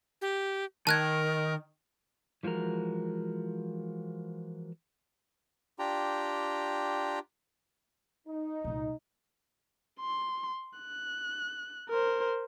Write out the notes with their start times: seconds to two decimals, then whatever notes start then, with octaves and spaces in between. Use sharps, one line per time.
0.21 G4
0.87 D#3 A#4 A5 F#6 G#6
2.43 E3 F3 G#3 F#4 A#4
5.79 D4 F4 G4 G5 A#5
8.27 D#4
8.64 C2 A#2
10.00 C6
10.79 F#6
11.89 A#4 C5